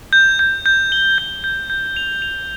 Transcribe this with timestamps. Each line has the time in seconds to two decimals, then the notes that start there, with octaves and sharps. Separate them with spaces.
0.13 G6
0.39 G6
0.66 G6
0.92 G7
1.18 G6
1.44 G6
1.70 G6
1.96 F7
2.22 F7